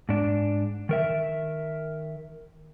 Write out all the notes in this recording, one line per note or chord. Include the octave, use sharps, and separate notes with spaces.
G#2 D4
D#3 A#4 E5